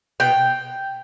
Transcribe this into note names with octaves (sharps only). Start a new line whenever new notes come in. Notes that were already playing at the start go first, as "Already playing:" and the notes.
B2 G5